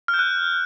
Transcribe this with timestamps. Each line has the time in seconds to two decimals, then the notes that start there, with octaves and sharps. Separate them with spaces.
0.08 F6
0.14 G6
0.19 F#6